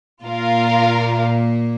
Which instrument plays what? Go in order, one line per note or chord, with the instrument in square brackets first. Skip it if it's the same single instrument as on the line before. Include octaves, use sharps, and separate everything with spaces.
[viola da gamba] A#2 A#3 [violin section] F4 A#4 F5